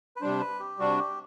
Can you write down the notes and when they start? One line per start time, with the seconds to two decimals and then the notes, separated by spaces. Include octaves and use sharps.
0.16 B4
0.21 C3 G3 D4 C5
0.41 B4
0.60 G4
0.79 C3 G3 D4 F#4
0.99 G4